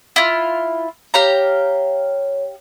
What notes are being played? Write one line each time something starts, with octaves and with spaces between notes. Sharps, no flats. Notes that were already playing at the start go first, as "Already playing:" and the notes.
E4 F4
G4 C#5 F5 A#5